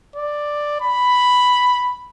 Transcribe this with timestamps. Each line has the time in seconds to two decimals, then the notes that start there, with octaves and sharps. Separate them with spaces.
0.16 D5
0.81 B5